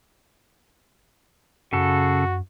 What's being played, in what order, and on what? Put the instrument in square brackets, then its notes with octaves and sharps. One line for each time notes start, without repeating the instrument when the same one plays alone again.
[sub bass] F#2 [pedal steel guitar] C#3 A4 [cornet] F#4